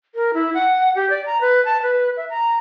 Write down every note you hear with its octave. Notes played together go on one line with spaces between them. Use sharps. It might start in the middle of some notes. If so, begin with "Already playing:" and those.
A#4
E4
F#5
G4
D5
A#5
B4
A5
B4
E5
A#5